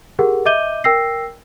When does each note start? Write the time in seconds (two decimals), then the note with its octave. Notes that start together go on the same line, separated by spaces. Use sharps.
0.19 G4 G#4 A#4 F#5
0.45 D#5 E5 D6 G6 D#7 G7
0.84 A#4 G5 E6 A#6 C7